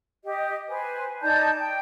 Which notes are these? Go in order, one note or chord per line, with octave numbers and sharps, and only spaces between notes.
G4 D#5
B4 C5 G#5
D#4 D5 A5 G6
G5